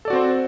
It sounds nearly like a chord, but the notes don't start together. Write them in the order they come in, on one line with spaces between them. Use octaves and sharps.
A4 D5 F#4 C4 C5